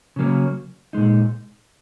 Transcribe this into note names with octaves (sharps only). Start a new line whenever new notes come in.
C#3 F#3 A#3 C#4
A#2 G#3 D#4